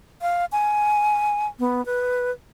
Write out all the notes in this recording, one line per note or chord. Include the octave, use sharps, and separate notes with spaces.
F5
G#5
B3
B4